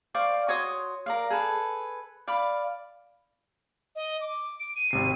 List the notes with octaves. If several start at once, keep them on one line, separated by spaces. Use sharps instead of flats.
C5 D5 F5 C#6
F#4 C#5 C6 D#6
A#4 D5 F5
G#4 A4 B4
D5 F5 B5
D#5
D6
D7
D#7
G#1 C3 C7